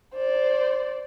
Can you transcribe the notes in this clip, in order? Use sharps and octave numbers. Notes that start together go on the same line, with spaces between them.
C5 D5